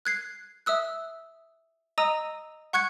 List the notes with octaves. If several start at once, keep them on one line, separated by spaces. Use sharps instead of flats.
F#6 G#6 C7
E5 D#6 E6 F#6
D#5 A#5 D#6 E6 D#7
F#5 C#6 F#6 G#6 C#7